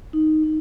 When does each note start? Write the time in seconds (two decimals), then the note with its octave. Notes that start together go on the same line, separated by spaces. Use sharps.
0.13 D#4
0.43 D#4